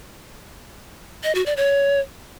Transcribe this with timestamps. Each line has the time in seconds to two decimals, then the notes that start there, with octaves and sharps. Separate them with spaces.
1.24 D#5
1.35 F#4
1.46 D5
1.57 C#5